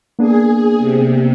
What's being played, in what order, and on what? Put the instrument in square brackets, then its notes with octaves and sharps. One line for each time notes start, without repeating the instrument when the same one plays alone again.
[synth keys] A#3 B3 D4 [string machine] G#4
[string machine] C3